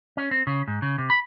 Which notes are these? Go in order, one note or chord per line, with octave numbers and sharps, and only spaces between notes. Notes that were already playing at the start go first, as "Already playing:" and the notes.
C#4
C4
C#3
G#2
C#3
C3
B5